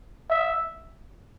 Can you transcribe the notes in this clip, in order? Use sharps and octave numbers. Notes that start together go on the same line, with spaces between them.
E5